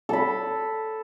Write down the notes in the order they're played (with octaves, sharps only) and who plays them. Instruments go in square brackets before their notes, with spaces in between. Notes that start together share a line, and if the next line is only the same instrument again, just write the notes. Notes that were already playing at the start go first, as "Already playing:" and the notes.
[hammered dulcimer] A4 B5